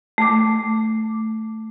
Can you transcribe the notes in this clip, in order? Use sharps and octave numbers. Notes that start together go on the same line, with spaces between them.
A3 D6